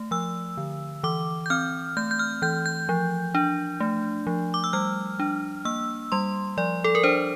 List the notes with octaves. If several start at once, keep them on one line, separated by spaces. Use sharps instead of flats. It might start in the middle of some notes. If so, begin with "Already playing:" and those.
Already playing: A3
F3 E6
D3
E3 D6
G6
C4 F6
A3 G6
G6
F6
E3 G6
G6
F3
D4
A3
F3
D6
E6
G3 F6
D4
A#3 E6
G3 C6
F3 D5
A4
A#4
D4 C5